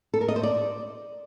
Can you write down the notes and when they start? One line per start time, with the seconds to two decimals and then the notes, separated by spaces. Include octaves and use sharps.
0.14 A4
0.21 A#4
0.28 D#5
0.36 C5
0.43 D5